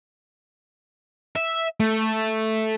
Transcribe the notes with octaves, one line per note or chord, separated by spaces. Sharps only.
E5
A3